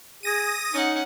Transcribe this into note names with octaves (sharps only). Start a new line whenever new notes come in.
G#4 D#6 A#6 D#7
C#4 D#4 F#5